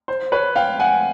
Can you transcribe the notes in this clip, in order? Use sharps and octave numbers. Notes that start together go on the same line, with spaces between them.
C5
B4 C#5
F5 G5
F#5 G#5